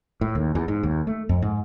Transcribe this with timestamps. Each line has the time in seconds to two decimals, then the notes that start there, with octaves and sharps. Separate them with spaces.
0.21 A2
0.35 D#2
0.55 E2
0.68 G#2
0.83 D#2
1.07 A3
1.29 F2
1.42 G#2